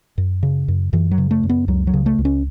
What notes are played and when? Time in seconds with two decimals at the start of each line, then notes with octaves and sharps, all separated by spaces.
0.18 F#2
0.43 C#3
0.68 F#2
0.93 F#2 E3
1.11 F#3
1.18 C#3
1.31 A3
1.43 F#2
1.49 B3
1.68 C#2 F#3
1.87 F#3
1.93 C#3
2.06 A3
2.18 C#2
2.25 C#4